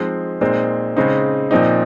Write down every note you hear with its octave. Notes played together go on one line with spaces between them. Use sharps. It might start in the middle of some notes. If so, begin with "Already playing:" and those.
Already playing: F3 G#3 C4 D#4
A#2 G#3 C4 D#4
C#3 G#3 C4 D#4
A#2 F3 C4 D#4